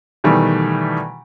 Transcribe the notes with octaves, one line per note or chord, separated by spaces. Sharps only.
B2 D#3 E3 G3 A3